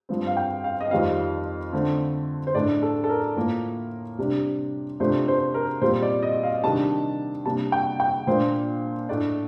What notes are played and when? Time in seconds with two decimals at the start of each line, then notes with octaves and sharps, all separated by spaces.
0.09 G2 F3 C4
0.27 F5
0.37 G5
0.64 F5
0.81 D#5
0.91 F2 D#3 G3 C4 F5
1.73 D3 A3 C4
2.47 C5
2.55 A2 A3 D4 D5
2.82 A4
3.04 A4
3.09 A#4
3.36 A2 F3 A#3 A#4
4.19 C3 G3 D4
5.00 C3 F3 A3 D4 C5
5.28 C5
5.54 A#4
5.82 A#2 G3 C4 C5
6.03 D5
6.23 D#5
6.43 F5
6.63 C3 D#3 G3 D4 A5
7.45 C3 G3 A#3 D4 A5
7.72 G5
8.00 G5
8.27 A#2 F3 A#3 D4 C5
9.09 A2 A3 D4 D5